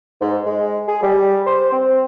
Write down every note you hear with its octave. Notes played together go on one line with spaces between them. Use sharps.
G#2
G#3
G#4
G3
C5
C4